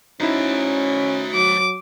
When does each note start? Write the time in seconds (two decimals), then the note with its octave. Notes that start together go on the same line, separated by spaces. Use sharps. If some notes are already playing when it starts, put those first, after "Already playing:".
0.20 C#4 D#4 E4 F#4 C5
1.34 F#3 D6